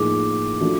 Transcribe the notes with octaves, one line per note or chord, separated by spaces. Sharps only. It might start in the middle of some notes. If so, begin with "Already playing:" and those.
Already playing: A2 F3 A#3 D#4 G#4 D6
F3 A3 D4 F#4